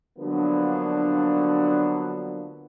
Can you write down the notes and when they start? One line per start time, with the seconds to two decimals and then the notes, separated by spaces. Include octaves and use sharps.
0.19 D3 F3 F#3 A#3 B3 D4